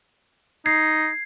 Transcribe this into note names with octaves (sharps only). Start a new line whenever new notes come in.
D#4 G#6 C7